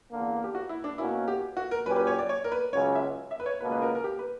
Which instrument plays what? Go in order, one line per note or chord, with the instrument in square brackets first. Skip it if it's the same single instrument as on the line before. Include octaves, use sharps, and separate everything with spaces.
[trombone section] E2 D3 A#3
[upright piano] G4
F#4
E4
D4
[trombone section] B2 A#3 C#4 F#4 [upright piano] E4
[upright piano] G4
F#4
A#4
[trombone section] A#2 F#3 C#4 G4 [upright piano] B4
[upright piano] B4
C#5
D5
C#5
A#4
B4
[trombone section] C#2 C#3 F#3 C#4 [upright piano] C#5
[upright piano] E5
E5
B4
C#5
[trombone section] C#2 B2 A#3 [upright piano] B4
[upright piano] B4
A#4
A#4
G4
B4